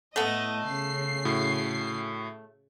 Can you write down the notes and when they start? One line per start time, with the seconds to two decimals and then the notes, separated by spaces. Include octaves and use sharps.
0.16 A2 A3 B3 D#5
0.67 C#3 C7
1.25 A2 F#4